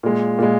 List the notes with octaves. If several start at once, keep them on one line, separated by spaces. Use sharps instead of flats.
A#2 G#3
A#2 G#3